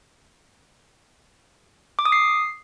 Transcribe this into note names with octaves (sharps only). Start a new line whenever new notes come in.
D6
D#6
C7